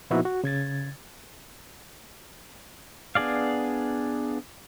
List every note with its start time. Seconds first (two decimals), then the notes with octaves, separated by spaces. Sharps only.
0.10 A#2 F3 B3 D#4 E4 F#4
0.25 F#4
0.44 C#3 G#6 A6
3.15 B3 D4 G#4 D5 F5